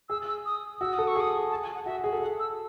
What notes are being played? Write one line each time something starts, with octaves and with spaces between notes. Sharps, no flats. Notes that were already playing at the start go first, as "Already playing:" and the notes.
G#4 E6
E6
D#6
F#4 E6
A4 D#6
C#6
G#4 D#6
A5
G#5
F#5
F#4 E5
G#4
A4
F#5
E6